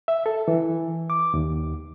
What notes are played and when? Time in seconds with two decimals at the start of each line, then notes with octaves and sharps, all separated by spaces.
0.08 E5
0.26 A4
0.48 E3
1.10 D6
1.34 D#2